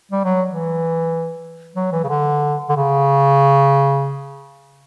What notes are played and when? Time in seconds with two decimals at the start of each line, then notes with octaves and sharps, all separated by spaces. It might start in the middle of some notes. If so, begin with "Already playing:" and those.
0.11 G3
0.24 F#3
0.49 E3
1.75 F#3
1.92 E3
2.04 C#3
2.09 D3
2.69 D3
2.76 C#3